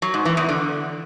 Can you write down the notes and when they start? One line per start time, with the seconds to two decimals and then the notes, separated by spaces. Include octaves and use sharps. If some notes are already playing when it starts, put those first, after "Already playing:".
0.02 F#3
0.14 G#2
0.25 E3
0.37 E2
0.49 D3